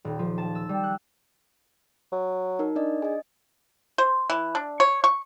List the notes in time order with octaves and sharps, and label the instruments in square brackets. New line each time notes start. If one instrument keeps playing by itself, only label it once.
[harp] D#1
F3
A5
E6
G3
F#6
[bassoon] F#3
[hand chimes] D#4 A#4
D4 D5 D#5
[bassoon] G#4 [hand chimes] D#5 G#5
[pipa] C5
E3
D4
C#5
C#6